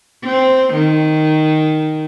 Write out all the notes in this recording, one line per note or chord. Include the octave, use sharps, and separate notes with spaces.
C4
D#3